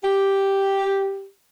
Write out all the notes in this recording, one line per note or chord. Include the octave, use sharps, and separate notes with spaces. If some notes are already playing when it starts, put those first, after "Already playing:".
G4